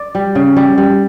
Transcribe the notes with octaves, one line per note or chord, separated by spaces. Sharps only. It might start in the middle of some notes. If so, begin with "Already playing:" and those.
Already playing: D5
G3
C#3
G3
G3